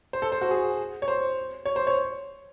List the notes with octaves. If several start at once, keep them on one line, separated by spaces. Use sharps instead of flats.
C5
A4
C5
F#4
G#4
C#5
C5
C#5
C5
C#5